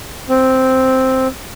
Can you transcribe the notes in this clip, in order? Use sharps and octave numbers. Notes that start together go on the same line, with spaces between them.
C4